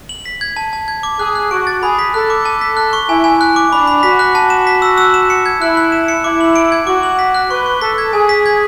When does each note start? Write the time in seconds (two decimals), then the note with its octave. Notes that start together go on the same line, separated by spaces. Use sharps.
0.09 F#7
0.26 B6
0.41 G#6
0.56 A5
0.73 A5
0.88 G#6
1.03 D6
1.19 G#4 F#6
1.35 F#6
1.51 F#4 D7
1.67 A6
1.83 G#4 B5
1.99 B6
2.14 A4 F#6
2.30 D6
2.45 A5
2.61 B6
2.77 F#6
2.93 C#6
3.09 E4 G#5
3.24 G#5
3.41 F#6
3.56 D6
3.72 D4 B5
3.87 B5
4.03 F#4 B6
4.19 F#6
4.35 A5
4.50 E7
4.67 B6
4.82 E6
4.98 E6
5.14 E7
5.30 C#7
5.46 G#6
5.61 E4 F#6
5.77 F#6
5.92 E7
6.08 C#7
6.24 E4 D6
6.41 F#7
6.56 D7
6.72 G#6
6.87 F#4 D6
7.03 F#7
7.19 B6
7.35 F#6
7.51 B4 C#6
7.66 C#6
7.81 A4 B6
7.98 G#6
8.13 G#4 G#5
8.29 B6
8.46 G#6